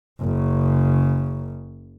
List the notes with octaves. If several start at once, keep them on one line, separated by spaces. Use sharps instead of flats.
F#1 C#3